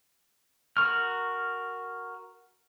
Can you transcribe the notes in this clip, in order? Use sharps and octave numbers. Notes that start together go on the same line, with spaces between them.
F#4 A#4 C#6 F6